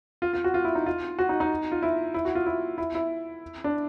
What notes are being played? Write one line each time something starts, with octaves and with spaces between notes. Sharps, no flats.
F4
F4
F#4
F4
E4
D#4
F4
F#4
D#4
D#4
F4
E4
E4
F#4
F4
E4
E4
E4
D4